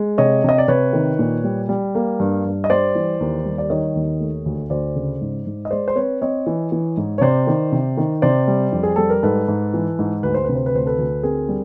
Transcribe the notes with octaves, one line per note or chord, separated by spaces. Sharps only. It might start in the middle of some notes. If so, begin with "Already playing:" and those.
Already playing: G#3
C3 C#5 D#5
C3 D#5
D5
C3 B4 C#5
D#3
A#2
G3
G3
A#3
G2
G2
D#5
G3 C5 D5
E3
D#2
G3
D5
D#3 C#5 D#5
D#2
A3
D2
D2 C5 D5
C#3
G#2
G#2
D#5
G#3 C5 D5
C5
C4 B4 C#5
C4 C#5 D#5
E3
E3
G#2
C#5
C3 C5 D5
D#3
C3
D#3
C3 C5 D5
G3
F2
G#4
G3 A4
A#4
G#2 A4 B4
G#2
E3
G#2
D2 B4
C5
C3 B4
C5
B4
D2 C5
A4 B4
D2
C4 G#4 A#4
G3